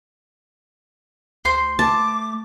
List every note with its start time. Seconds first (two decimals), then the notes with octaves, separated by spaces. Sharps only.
1.45 D2 C5 C6
1.79 A3 A5 D6